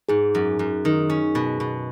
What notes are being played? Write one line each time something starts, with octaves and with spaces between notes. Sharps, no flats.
G#2 G#4
F#2
F#2
D#3
C#4
B2
B2